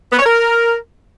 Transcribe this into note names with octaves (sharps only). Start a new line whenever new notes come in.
B3
C#5
A#4